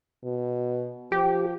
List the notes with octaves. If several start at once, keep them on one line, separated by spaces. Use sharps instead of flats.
B2
F3 G4